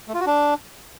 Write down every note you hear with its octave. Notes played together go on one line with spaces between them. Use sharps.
A3
F4
F#4
D4